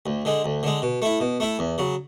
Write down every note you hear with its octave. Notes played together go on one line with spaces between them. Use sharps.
D2
D3 G#3
D2
D3 G#3
B2
A3 E4
B2
A3 E4
E2
C#3 F#3